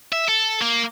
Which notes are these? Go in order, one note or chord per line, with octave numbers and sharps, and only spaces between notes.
E5
A4
A#3